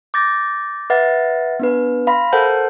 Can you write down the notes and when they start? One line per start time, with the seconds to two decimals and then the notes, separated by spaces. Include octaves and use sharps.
0.14 D6 G6 A6 A#6
0.90 B4 E5 F#5 A6
1.60 B3 D4 B4
2.07 F5 B5 C6 A#6
2.33 A4 A#4 C5 F#5 A5 G6